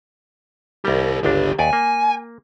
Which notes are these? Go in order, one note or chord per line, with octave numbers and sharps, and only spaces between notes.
C2 G3 G4 A#4
G1 C#2 D3 D4 G4
D#2 D5 G#5
A#3